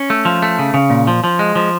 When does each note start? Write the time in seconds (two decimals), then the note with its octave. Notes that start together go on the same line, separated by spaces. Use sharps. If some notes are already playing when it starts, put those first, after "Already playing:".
Already playing: C#4
0.10 A3
0.25 F3
0.42 A3
0.59 C#3
0.74 C#3
0.90 A#2
1.07 F3
1.24 F3
1.39 G#3
1.56 F3